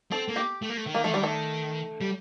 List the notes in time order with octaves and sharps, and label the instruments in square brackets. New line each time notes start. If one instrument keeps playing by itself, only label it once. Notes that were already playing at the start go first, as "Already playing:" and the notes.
[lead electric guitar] C4 [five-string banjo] A4
[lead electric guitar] A#3
[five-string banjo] G4
[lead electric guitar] A3
A#3
A3
D#3
[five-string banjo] A#3
[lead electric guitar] F3 [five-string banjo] A3
[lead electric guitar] D#3 [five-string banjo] G3
[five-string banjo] A3
[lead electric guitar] G3